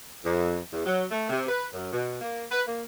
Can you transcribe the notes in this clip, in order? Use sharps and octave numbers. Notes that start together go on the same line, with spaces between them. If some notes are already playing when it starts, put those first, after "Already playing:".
F2
E2
F#3
A3
C3
B4
F#2
B2
A#3
B4
A#3